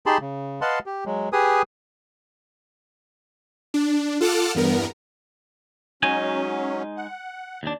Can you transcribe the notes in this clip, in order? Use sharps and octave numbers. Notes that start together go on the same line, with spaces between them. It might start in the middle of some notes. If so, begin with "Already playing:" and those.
D#4 G4 G#4 A5 B5 C6
C#3
B4 D#5 F5 F#5 A5 C6
G4
F#3 G#3
G4 G#4 B4 G#5 D#6
D4
F4 A4 F#5 A5 D6 F6
E2 G2 B3 A#4
F#3 G#3 C#4 D#4 G#5
F#5
D#2 D4